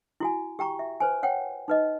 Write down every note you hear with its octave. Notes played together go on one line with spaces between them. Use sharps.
E4 F#4 G#5
G4 G5 A#5 C#6
E5
B4 C5 G#5
C#5 F#5 G5
D#4 B4 D#5